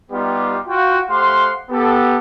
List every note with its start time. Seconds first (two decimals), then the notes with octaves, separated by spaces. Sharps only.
0.11 G3 B3 D#4 F4 G4
0.67 F4 F#4 G5
1.10 A3 G4 C5 F5 F#5 C6
1.70 B3 G4 A4